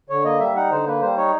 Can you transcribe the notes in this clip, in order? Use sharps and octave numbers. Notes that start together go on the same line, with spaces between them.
D3 C#5
A#3 D#5
G3 E5
D#4 F#5
D3 C5
A#3 B4
G3 C5
D#4 C#5